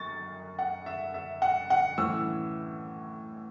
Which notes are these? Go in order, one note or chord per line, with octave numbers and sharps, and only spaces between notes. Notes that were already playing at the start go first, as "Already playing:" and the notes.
Already playing: F#2 C#6 A6
F#5
E5
E5
F#5
F#5
A2 E3 C#4 E6